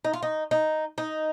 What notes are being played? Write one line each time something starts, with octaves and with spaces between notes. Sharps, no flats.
D#4
F4
D#4
D#4
D#4